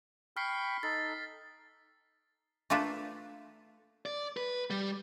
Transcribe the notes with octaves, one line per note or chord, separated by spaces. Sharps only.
G5 B5 C#6 F6 B6 C7
D#4 A4 A6
A3 A#3 D4 F4 A4 B4
D5
B4
G3